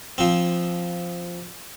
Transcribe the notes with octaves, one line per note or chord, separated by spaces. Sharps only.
F3 C4